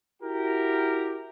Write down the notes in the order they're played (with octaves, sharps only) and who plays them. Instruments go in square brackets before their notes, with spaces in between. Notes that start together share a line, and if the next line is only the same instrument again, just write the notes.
[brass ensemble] E4 F#4 G4 A#4